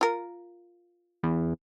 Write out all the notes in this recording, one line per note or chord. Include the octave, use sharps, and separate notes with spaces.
F4 A#4
E2